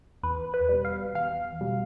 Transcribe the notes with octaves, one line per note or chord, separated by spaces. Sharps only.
E2 B4
B4
B2 G3
F5
E2 F5
B2 G3